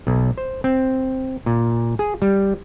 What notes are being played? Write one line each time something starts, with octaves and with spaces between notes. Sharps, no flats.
B1
C5
C4
A#2
G#4
G3